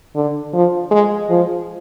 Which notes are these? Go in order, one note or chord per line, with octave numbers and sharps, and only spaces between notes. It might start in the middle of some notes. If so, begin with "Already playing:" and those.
D3
F3
G#3
F3